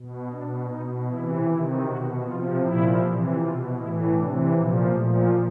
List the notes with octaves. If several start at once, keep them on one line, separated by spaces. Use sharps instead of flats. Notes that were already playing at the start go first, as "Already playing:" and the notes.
Already playing: B2
B2 D4
B2 D#4
C3 E3 E4
C3 D#3 E4
B2 F#4
C3 F3 F4
A#2 F3 E4
C3 E3
B2 F4
A2 E3 E4
C3 E3 D4
A#2 F3 A#3
A#2 F3 A3